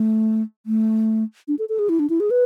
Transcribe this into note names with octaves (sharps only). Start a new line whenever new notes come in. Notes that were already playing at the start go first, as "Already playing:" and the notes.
Already playing: A3
A3
D4
A4
A4
G#4
E4
D4
E4
G#4
B4